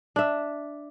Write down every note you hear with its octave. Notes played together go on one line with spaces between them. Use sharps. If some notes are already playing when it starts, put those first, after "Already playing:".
D4 E5